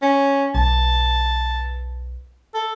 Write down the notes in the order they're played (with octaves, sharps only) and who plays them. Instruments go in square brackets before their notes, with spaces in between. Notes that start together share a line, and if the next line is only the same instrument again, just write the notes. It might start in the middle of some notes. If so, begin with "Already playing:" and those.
[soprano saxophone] C#4
[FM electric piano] B1 [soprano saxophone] A5
[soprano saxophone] A4